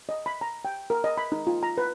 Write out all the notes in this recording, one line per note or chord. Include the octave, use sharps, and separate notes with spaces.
D#5
B5
A#5
G5
A#4
D#5
B5
D#4
F4
A#5
B4